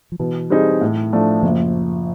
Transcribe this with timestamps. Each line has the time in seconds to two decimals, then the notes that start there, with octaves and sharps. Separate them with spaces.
0.12 F3
0.20 B2 E3
0.50 G3 C4 D#4 G#4
0.81 A2
1.13 F3 A3 D4
1.43 F#1 F3